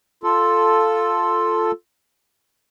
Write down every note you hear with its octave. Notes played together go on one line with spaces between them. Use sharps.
F4 A4